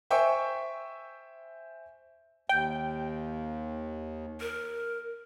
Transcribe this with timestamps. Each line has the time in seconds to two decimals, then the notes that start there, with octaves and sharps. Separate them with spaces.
0.11 C5 E5 G5 G#5 C#6
2.49 D#2 G5
4.41 A#4